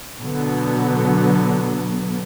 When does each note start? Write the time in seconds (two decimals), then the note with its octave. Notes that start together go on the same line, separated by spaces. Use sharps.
0.20 B2 D3 F#3 B3